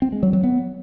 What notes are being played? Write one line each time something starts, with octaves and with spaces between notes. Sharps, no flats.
C4
G#3
F#3
F#3
B3